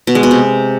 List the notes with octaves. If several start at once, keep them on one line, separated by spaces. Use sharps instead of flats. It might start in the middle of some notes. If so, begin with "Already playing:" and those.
B2
G#3
B2
C3